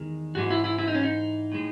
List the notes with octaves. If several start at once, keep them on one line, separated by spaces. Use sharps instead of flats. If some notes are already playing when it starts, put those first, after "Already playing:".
Already playing: E2 D#3 G#3
G#2 E3 G#3 F#4
E4
E4
E4
D#4
C#4
D#4
A2 G#3